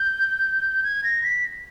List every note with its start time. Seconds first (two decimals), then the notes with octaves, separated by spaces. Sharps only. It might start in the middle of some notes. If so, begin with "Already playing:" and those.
Already playing: G6
0.84 G#6
1.04 A#6
1.23 B6